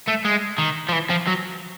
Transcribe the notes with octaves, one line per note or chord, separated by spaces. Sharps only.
A3
G#3
D#3
F3
E3
F3
F#3